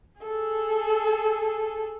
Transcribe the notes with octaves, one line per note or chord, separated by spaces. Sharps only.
G#4 A4